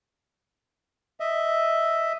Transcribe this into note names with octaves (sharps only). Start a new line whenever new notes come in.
D#5 E5